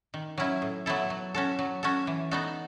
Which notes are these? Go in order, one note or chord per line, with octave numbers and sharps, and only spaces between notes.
D#3
F#3 C#4 E4
A2
F#3 B3 E4 A4
F#3
C#4 F#4 A4
F#3
C#4 F#4 A4
E3
B3 D#4 F#4 A4